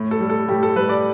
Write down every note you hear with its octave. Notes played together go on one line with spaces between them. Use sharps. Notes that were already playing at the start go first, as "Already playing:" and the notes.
Already playing: A2
A4
G3
A4
A2 G4
A4
G3 B4
D5